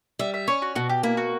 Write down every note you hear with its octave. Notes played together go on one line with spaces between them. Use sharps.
G3 E5
E5
C#4 C#5
F#4
B2 F#4
G4
A#3 E4
F#4